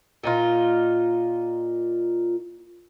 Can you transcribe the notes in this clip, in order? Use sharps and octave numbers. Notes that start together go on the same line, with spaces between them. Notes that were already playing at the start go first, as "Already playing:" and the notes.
A#2 D#4 F4